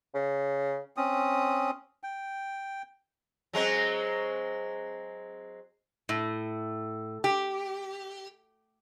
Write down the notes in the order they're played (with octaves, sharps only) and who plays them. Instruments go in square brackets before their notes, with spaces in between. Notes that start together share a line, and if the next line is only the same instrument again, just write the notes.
[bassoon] C#3
[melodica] C4 C#4 D#6
G5
[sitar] F#3 G#3 C4
[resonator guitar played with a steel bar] A2
G4